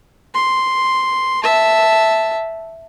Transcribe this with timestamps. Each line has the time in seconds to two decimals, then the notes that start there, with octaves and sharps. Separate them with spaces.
0.34 C6
1.43 E5 A5